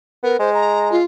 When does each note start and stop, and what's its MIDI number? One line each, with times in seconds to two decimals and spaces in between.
0.23 0.36 59
0.23 0.37 70
0.39 0.98 56
0.39 0.52 72
0.53 0.91 82
0.91 1.03 65